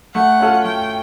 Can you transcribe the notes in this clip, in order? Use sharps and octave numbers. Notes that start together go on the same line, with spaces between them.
A3 F#5
C#4 F4 A4
A3 G5